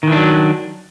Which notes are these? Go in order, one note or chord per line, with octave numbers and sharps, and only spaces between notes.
D#3 E3 F#3 D4